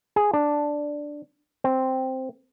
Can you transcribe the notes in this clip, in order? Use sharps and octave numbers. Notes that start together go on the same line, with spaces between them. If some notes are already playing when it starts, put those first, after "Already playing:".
G#4
D4
C4